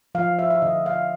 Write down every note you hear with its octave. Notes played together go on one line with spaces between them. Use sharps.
F3 F5
E5
E5
D3 D#5
F5